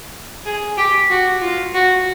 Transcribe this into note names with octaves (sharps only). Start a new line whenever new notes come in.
G#4
G4
F#4
F4
F#4